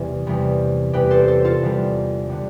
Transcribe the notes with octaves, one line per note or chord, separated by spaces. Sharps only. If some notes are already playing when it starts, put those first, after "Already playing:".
Already playing: E2 C3 G3
E2 C3 G3
E2 C3 G3 G4 B4
A4 C5
A4 C5
F4 A4
E2 D3 G3
D3 G3